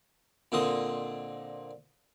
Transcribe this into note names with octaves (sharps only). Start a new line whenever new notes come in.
A#2 D3 C4 D#5